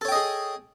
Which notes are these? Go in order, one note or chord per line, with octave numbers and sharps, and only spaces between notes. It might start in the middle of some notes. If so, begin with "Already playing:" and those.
G#4 A4 C#5 D#5 G5